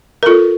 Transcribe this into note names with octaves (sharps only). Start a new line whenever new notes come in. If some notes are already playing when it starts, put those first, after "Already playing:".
A#4
F4 A4